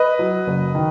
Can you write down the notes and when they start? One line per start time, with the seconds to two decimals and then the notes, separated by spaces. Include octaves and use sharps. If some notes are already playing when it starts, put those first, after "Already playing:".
Already playing: B4 D#5
0.19 F#3
0.47 F#1
0.75 D#3